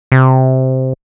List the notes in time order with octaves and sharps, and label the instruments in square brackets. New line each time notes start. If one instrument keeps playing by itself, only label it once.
[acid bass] C3